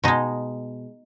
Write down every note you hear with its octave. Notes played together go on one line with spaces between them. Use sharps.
B2 G#3 D#4